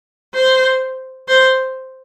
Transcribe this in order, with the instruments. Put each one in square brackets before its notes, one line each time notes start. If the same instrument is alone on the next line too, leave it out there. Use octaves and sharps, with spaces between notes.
[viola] C5
C5